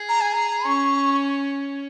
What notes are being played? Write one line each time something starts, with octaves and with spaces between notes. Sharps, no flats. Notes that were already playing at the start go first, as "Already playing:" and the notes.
Already playing: G#4
A#5
G#5
A#5
C#4 C#6